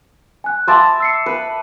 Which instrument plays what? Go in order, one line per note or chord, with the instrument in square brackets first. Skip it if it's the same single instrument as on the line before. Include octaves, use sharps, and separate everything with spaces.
[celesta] G#5 F#6
[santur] E5 A5 D6 [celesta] B5 C6 A6
[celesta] E6 C7 C#7
[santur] B4